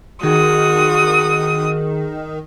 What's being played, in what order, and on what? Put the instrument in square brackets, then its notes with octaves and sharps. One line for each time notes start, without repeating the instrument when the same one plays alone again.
[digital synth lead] D#3 [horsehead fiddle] F#4 [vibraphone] G#4 [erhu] D#6